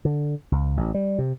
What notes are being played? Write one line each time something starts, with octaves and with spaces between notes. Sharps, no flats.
D3
C#2
A1
G3
C3